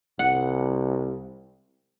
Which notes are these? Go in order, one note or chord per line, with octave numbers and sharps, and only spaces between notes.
C2 F#5